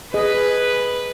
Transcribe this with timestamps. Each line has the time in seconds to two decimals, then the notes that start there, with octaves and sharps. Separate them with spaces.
0.14 G#4 B4 D#5